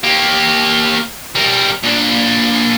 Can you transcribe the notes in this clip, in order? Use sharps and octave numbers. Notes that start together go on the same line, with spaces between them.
A#3 G4
G3 A#4
A#2 D4